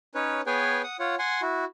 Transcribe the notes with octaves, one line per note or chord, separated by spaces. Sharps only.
C#4 D#4 B4 C#5
B3 G#4 B4 C#5 G5 G#5
F#5 D#6
F4 C#5 F#5
F#5 G#5 C6
E4 F#4